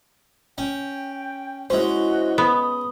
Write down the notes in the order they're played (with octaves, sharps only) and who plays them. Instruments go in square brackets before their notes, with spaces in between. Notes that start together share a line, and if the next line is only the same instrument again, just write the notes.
[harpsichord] C#4 [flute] G5
[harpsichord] G#3 C#4 [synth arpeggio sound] E4 C5 [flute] F#4
[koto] B3 [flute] D#6